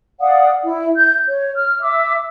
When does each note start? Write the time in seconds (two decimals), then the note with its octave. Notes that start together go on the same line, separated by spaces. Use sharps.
0.20 D5 F5 F#5 D#6
0.65 E4
0.96 G6
1.27 C#5
1.56 F6
1.82 E5 D6 E6